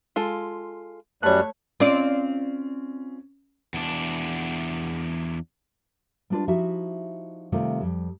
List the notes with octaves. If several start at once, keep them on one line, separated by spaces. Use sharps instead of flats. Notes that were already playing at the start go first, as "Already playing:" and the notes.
G#3 F4 A4
F#2 G3 A3 C#5 F#6
C4 C#4 F4 D5
E2 D4
G3 B3 D4 F4 B4 D5
F3 D#4 E4 F#4 G4 E5
C3 D#3 G3 A3 C4 F4
F2 G3